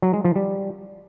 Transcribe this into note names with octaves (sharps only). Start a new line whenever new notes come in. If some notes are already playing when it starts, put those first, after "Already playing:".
F#3
G#3
F3
G3